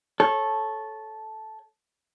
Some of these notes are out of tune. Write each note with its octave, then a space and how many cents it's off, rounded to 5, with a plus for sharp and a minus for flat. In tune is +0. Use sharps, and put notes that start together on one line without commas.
A4 -10 C#5 -15